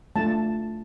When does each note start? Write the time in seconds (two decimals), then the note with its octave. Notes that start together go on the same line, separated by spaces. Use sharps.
0.16 A3 D4 F4 A5